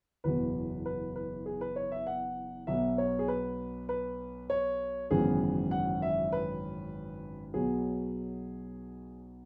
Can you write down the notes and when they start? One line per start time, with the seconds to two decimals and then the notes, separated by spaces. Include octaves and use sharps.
0.24 F#1 E2 B2 B3 B4
0.86 B4
1.16 B4
1.46 G#4
1.61 B4
1.76 C#5
1.92 E5
2.07 F#5
2.67 B1 B2 B3 E5
2.98 C#5
3.19 G#4
3.28 B4
3.89 B4
4.50 C#5
5.11 G#1 F#2 C#3 E3 B3 G#4
5.71 F#5
6.02 E5
6.32 B4
7.54 B1 B2 F#3 B3 G#4